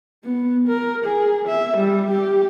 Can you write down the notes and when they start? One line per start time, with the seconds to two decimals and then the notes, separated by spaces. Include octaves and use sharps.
0.25 B3
0.68 A#4
1.05 G#4
1.48 E5
1.77 G3
2.11 G4